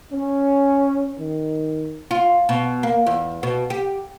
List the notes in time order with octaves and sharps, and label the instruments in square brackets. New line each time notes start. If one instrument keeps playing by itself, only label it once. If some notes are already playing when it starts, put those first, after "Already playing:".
[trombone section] C#4
D#3
[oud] F4
B2
A#3
E2
B2
G4